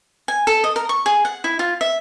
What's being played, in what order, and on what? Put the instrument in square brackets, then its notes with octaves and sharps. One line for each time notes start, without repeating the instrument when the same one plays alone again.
[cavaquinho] G#5
A4
D#5
A#4
C#6
G#4
F#5
E4
F4
E5